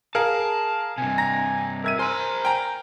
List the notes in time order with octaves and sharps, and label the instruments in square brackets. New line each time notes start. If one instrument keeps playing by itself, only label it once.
[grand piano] G#4 A#4 F5 [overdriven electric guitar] A5
[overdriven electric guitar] G2 C3 [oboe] G#5
[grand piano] A#5 [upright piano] A#6
[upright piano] A#4 G#6 D#7 [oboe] E5
[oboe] A#4 [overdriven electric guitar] C5 B5 [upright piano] G#5 C6 F6
[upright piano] G5 G#5 A#5